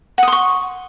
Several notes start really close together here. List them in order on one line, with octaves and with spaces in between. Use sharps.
F#5 D#6 C6 C#6